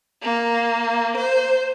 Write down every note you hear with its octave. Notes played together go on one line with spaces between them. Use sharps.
A#3
C5